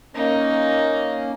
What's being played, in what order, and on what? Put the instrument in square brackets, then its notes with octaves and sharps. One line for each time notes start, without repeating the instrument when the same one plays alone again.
[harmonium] A#3 C#4 [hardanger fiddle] D#4